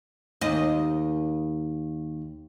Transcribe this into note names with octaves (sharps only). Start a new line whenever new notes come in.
D#2 D#5